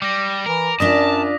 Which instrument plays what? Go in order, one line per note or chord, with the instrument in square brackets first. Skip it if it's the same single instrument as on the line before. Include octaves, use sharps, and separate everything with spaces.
[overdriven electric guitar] G3 [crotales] D6 A#6
[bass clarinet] E3 [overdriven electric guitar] A#4
[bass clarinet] F#2 [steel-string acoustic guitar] D4 F4 D5 [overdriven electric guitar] A5 [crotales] D#6 A#6 B6